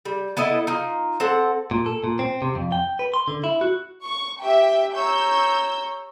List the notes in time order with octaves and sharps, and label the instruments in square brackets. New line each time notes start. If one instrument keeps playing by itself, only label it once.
[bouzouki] G3
B3 E4 A4 D#5
D#4 F4
C4 A4 F#5
[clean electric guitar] A#2
A4
A#2
C4
C3
F2
G5
B4
C6
D3
E4
F#4
[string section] C#6
[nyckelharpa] G4 [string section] E5 G5
[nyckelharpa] C#5 A#5 [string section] E6 G6